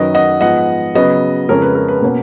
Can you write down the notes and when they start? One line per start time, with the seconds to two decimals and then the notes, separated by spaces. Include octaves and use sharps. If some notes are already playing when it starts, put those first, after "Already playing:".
Already playing: F#2 D#3 F#3 B4 D#5
0.14 D#5 F#5
0.41 G#2 F3 B3 D#5 F#5
0.95 C#3 F#3 B3 B4 D#5
1.49 F2 C#3 G#3 C#4 A#4
1.62 B4
1.75 A#4
1.88 B4
2.02 B2 A#3 C#4